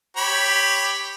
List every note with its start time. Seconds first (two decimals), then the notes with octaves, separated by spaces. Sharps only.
0.17 G4 C#5 B5